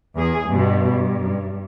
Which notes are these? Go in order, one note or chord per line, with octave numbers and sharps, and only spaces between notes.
E2 G#4
G2 B2
G2